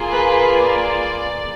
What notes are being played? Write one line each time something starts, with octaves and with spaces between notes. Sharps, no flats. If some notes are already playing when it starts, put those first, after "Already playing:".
Already playing: A#3 F4 G#4
B4
D5